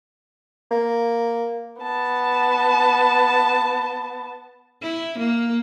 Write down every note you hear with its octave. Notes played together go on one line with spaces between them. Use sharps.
A#3
B3 A5
E4
A#3